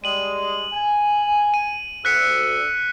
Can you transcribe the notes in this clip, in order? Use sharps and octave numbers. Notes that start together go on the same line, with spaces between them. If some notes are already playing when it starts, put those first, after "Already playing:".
G3 G#3 D#7 F#7
G#5
D#7
D2 E6 F#6 B6 C#7